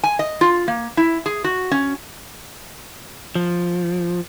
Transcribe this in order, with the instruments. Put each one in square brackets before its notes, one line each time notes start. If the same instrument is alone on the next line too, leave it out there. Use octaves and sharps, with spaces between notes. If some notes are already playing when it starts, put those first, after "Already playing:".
[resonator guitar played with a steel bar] G#5
D#5
F4
A#3
E4
G#4
F#4
C#4
[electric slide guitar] F3